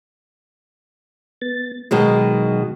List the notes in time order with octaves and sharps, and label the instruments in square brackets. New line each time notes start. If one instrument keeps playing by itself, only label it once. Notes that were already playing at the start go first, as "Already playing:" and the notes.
[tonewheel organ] B3 A6
[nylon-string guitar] B2 D#3 G#3 [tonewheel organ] F#3